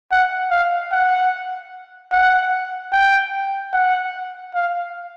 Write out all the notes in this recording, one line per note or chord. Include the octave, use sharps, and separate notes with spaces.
F#5
F5
F#5
F#5
G5
F#5
F5